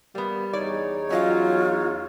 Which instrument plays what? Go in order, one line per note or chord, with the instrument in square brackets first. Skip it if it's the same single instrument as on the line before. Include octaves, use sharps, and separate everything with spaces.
[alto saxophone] G3 [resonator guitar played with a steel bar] A#3 B3
[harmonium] E2 D#4 C#5 [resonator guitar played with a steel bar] D5
[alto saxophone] F#3 [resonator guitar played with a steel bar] C#4 D#5 F5 [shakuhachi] F4